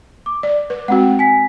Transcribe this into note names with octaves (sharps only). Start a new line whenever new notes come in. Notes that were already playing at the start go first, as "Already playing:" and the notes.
D6
D5
B4
G#3 C4 F#4 F#5 G5
G#5 B6